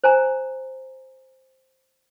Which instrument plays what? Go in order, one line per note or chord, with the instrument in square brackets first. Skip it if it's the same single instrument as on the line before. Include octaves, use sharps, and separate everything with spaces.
[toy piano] C5 G#5 A#5